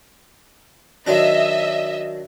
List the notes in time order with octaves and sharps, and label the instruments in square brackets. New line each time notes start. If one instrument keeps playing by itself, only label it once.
[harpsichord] D#3 F#3 D4 [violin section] D#5 E5